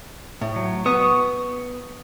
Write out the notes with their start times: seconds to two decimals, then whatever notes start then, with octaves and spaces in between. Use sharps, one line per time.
0.41 A2
0.56 F#3
0.86 B3 C#6 D#6